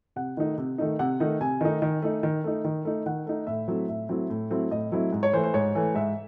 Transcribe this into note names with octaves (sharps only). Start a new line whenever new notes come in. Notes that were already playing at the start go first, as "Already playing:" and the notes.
C3 F#5
D#3 A3 D#4
C3
D#3 A3 D#4
C3 F#5
D#3 A3 D#4
C3 G#5
D#3 A3 D#4
D#3
A3 D#4
D#3
A3 D#4
D#3
A3 D#4
D#3 F#5
A3 D#4
A2 E5
F#3 A3 C4 E4
A2 E5
F#3 A3 C4 E4
A2
F#3 A3 C4 E4
A2 D#5
F#3 A3 C4 E4
G#2
C#5
E3 A3 C5
C5
G#2 C#5
E3 A3
G#2 E5